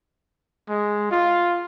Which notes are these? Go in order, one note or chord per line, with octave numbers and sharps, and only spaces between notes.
G#3
F4